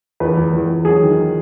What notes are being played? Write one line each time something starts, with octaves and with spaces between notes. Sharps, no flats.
E2 B4
E2
E2
E2
F#3 G#4
D#3